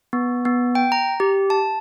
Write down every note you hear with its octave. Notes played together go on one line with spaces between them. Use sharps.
B3
B3
G5
A#5
G4
A5